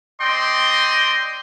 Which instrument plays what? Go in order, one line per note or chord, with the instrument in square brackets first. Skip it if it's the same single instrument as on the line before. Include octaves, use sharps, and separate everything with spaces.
[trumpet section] C4 D5 D#5 G5 C6